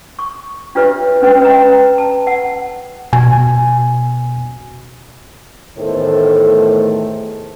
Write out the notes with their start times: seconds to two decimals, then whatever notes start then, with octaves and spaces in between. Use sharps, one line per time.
0.19 C#6
0.75 D4 F4 G4 B4 C#5 E5
1.22 C#4 D4 B4 G5
1.41 B4 C#5 D#5 G5 A#5
1.98 A5
2.27 F#5
3.13 B2 G#5
5.78 E2 A2 D#3 A3 A4 C5